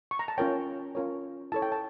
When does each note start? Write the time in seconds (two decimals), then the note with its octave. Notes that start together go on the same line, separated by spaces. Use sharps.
0.11 C#6
0.19 A#5
0.28 A5
0.38 C#4 F4 A#4 C#5 G5
0.95 C#4 F4 A#4 C#5
1.52 E4 A4 C#5 A5
1.62 G5
1.72 A5